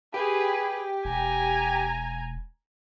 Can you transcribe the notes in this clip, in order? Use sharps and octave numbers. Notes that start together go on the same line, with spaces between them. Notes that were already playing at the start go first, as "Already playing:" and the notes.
G4 G#4 B4
E1 G#5 A#5